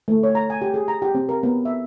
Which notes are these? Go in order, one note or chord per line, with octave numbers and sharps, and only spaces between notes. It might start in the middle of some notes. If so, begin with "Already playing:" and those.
A3
C#5
A#5
G#5
G4
G#4
A#5
G4
C4
A#4
B3
E5